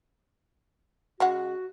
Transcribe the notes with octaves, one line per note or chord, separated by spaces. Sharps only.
C#3 G#3 F#4 F#5